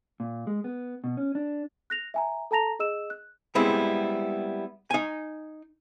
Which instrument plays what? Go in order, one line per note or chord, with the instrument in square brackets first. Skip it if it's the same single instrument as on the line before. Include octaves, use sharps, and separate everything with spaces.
[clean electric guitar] A#2
G#3
B3
B2
C#4
D4
[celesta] F#6 A#6 F7
E5 G#5 A#5
A4 A5 A#5 A#6 F7
G#4 D#5 E6 E7
F#6
[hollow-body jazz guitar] G3 G#3 B3 C4 E4
D#4 G#5